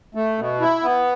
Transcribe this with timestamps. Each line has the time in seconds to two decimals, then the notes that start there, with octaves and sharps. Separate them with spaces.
0.15 A3
0.38 B2
0.61 E4
0.83 B3